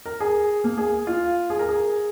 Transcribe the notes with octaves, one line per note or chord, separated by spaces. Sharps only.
A#4
G#4
A#3
G#4
F4
G#4
A#4
G#4